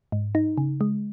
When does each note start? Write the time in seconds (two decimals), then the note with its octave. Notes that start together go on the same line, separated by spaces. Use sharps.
0.12 G#2
0.35 D#4
0.58 C#3
0.81 G#3